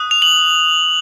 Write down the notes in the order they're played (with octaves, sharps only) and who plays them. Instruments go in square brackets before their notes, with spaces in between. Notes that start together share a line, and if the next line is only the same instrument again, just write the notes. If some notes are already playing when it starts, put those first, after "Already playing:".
Already playing: [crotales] D#6 F#6
F7
F#7